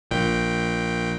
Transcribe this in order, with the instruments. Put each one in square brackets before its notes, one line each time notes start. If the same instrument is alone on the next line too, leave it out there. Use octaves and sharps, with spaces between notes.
[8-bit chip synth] A#1 A#2 G5